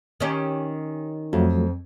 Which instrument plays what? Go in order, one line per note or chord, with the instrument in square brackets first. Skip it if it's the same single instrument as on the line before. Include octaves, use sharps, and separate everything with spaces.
[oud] D#3 C#4 G4
[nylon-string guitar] F2 [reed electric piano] F3 F#3 A3